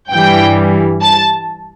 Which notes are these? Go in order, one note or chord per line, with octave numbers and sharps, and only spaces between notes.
G2 E3 G3 G5
A5